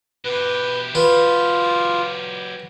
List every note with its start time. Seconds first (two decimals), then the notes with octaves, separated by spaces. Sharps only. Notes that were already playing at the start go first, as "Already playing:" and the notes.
0.25 B2 G4 B4
0.95 F#3 F4 G4 B4